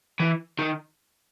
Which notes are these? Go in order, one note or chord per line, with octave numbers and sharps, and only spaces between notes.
E3
D#3